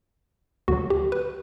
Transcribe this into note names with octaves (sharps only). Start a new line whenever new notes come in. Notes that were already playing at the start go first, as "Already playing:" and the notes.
D2 D3 F#3 F#4
G4
B4